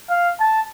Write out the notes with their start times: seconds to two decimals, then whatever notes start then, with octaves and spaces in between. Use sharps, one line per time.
0.10 F5
0.40 A5